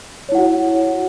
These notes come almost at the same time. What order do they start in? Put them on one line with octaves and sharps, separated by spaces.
C#5 E4 F#5 F#4